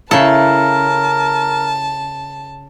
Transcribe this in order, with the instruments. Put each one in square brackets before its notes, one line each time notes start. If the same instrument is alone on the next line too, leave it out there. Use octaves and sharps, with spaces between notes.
[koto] C#3 A4 [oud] E4 [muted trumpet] A#4 [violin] A5